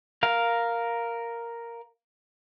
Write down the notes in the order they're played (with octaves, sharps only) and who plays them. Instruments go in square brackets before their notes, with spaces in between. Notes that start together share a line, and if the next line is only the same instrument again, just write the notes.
[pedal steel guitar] A#4 F5